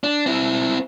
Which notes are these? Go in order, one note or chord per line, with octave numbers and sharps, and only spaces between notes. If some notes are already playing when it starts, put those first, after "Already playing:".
D4
C4 E4